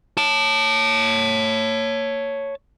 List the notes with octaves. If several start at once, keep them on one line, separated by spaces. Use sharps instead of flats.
C#5 A5